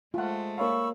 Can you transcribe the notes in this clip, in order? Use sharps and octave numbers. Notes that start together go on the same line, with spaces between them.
G#3 A3 F4 C5 F#5
A#3 C#5 F5 B5 C#6 E6